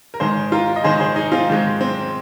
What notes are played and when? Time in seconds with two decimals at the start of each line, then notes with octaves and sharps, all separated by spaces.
0.14 A#4
0.20 G#2 D#3 G#3 G#4 C5
0.52 F4 A#4
0.76 D#5
0.84 G#2 D#3 G#3 G#4 C5
1.00 G#4 C5
1.16 D#4 G#4
1.32 C4 F4
1.48 G#2 D#3 G#3
1.81 C4